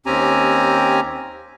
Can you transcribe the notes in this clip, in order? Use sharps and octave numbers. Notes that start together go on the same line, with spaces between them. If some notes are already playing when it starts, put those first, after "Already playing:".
D#2 C4 C#4 G4 G#5 A#5